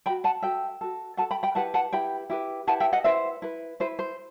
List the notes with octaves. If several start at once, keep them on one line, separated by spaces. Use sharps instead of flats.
A4 G5 B5
F#4
F#5 A5
F#4 A4 E5 G5
F#4 A4
F#4 A4 F#5 A5
G5 B5
G5 B5
E4 G4 B4 F#5 A5
F#5 A5
E4 G4 B4 G5 B5
E4 G4 B4
E4 G4 B4 F#5 A5
E5 G5
D#5 F#5
E4 B4 C5 E5
E4 B4
E4 B4 C5
C5